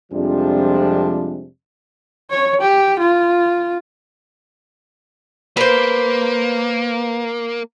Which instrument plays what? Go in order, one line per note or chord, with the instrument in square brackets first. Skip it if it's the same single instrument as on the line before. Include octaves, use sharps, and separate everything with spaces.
[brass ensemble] F2 C3 F3 G3 G#3 D4
[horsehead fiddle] C#5
G4
F4
[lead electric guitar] A#3 [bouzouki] B4 C5